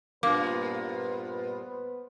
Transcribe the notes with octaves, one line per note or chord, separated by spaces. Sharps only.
G2 A#2 A#3 B3 B4 C5 D6